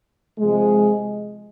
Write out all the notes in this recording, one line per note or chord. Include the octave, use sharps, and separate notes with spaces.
C3 F3 G#3